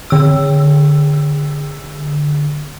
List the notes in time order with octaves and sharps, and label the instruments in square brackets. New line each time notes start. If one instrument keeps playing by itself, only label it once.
[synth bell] D3 E6